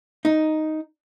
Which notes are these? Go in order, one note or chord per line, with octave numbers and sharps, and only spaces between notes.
D#4